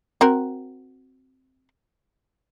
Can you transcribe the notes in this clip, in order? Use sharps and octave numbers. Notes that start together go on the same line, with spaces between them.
C4 F#4 A#4